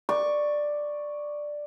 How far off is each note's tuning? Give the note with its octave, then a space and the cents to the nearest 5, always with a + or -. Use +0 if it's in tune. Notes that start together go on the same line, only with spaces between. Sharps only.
D5 +5 C#6 +0